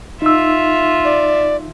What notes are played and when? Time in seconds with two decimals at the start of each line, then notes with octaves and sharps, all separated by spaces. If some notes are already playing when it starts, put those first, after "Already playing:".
0.22 D#4 F4 E5 E6
1.05 D5